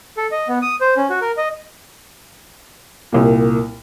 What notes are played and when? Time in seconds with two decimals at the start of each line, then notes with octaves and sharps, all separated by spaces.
0.17 A4
0.31 D#5
0.48 B3
0.62 D#6
0.81 C5
0.97 C#4
1.10 F#4
1.21 A#4
1.37 D#5
3.12 C2 A#2